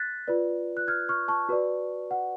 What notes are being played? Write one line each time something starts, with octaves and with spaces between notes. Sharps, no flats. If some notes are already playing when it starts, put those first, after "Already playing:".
Already playing: F#6 A6 B6
F4 B4 D5
F#6
F6 G#6
C#6 F6
A5 C#6
F#4 B4 D5
F#5